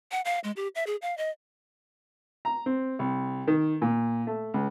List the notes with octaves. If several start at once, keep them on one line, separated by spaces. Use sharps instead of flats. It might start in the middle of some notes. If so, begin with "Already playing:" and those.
F#5
F5
G#3
G4
E5
G#4
F5
D#5
A#5
C4
C2
D#3
A#2
A3
C#2